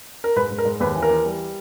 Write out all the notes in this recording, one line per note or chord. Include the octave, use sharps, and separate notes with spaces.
A#4
G#2 B4
G#2
A#4
G#2
D#2 B4
E3
A#4
E3
G3